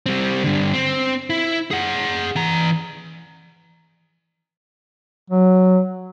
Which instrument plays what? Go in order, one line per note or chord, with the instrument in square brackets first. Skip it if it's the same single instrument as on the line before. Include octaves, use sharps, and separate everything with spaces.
[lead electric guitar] G3 C4
G2 D3
C4
E4
G#4 F#5
E3 A#5
[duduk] F#3